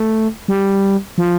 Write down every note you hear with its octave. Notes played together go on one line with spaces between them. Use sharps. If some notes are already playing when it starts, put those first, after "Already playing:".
Already playing: A3
G3
F3